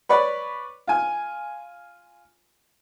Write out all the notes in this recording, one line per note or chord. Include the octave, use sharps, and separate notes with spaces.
B4 C#5 D5 B5
F4 G#5